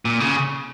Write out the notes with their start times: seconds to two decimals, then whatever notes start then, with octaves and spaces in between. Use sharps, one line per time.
0.05 A#2
0.20 C#3